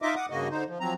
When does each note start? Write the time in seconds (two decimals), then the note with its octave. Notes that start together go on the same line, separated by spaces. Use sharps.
0.02 D#4 F4 D#5 E5 D6
0.16 F#5 D6 D#6
0.30 G2 C#3 A#3 F#4 D#5
0.51 D3 D#4 C5
0.67 F3
0.80 F3 F#3 C4 A#5